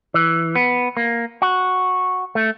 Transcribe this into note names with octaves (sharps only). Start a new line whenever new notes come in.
E3
B3
A#3
F#4
A3